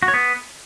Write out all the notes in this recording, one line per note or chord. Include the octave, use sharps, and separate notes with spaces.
F#4
C#5
B3